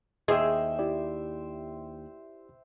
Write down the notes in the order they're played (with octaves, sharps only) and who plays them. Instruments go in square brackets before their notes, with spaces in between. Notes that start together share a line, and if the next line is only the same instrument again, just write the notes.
[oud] D#2 G#4 [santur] C5 E5 G5 [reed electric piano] D#5
[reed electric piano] E4 G4 D5